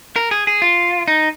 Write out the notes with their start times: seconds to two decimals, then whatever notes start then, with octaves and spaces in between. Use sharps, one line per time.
0.16 A#4
0.31 G#4
0.47 G#4
0.62 F4
1.08 D#4